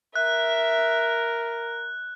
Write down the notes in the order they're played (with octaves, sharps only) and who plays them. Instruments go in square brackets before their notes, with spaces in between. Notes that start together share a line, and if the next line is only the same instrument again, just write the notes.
[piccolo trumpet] A#4 [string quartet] E5 [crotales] F#6